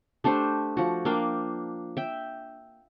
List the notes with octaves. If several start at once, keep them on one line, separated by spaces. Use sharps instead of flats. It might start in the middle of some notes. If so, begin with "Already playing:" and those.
A3 D4 G4 C5
F3 F#4
A#3 D4 F5 G5
E5 G5